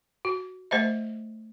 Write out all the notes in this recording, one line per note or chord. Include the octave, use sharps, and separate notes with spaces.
F#4
A3 C5 D#5 E5